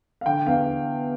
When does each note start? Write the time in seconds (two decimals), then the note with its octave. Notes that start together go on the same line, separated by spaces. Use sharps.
0.21 F5
0.26 D3 G5
0.47 E2 F5